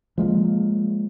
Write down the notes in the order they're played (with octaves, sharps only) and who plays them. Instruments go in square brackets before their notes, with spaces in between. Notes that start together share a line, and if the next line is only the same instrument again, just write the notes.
[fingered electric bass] F3 G#3 A#3